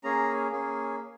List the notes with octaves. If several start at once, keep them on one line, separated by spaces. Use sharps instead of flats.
A#3 C#4 G#4 A#5
A#3 C#4 G#4